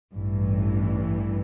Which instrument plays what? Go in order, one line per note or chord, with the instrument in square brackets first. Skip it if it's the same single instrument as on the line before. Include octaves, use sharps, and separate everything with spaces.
[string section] A1 G2 E3